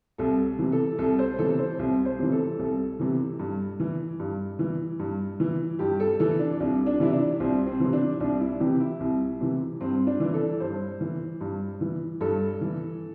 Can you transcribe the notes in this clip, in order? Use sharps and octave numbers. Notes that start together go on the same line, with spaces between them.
C2 A4
C3 E3
A4
C2 A4
C5
C3 E3 A4
C5
C2
C5
C3 E3
A4
C2 A4
C3 E3
G2
E3
G2
E3
G2
E3
G2 G4
A4
E3 A4
D4
C2 D4
D4
C3 E3 E4
D4
C2 C4
C4
C3 E3
D4
C2 D4
E4
C3 E3 G4
E4
C2
C3 E3
G2 C4
D4
E3
A4
G2 C5
E3
G2
E3
G2 A4
E3